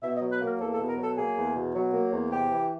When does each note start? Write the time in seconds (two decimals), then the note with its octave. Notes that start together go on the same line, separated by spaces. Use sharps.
0.03 B2 E5
0.17 D#5
0.22 F#3
0.31 B4
0.41 A#3
0.46 A#4
0.60 E2 A4
0.74 A4
0.79 B2
0.88 A#4
0.98 F#3
1.03 A4
1.17 A#3 G#4
1.36 E2
1.55 B2
1.74 F#3
1.93 A#3
2.12 E2
2.31 C3 G4
2.50 E3